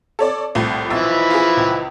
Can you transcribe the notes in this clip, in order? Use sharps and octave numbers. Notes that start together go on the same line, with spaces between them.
A4 C#5 D5
C2 A2 F3
B1 E3 F3 E4 E6 A6
F4 G#4
C#2